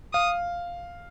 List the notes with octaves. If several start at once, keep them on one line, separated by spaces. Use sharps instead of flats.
F5 D#6